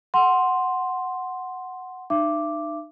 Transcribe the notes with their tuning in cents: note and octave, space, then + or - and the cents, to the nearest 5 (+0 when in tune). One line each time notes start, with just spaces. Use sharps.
F#5 +0 C6 +0
D#4 -40 E5 +40 D6 +0